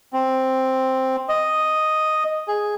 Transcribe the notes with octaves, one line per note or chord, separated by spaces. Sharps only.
C4
D#5
G#4